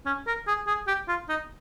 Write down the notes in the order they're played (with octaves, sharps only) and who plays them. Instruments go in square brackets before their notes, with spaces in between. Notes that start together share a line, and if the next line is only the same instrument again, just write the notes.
[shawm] C#4
A#4
G#4
G#4
G4
F4
D#4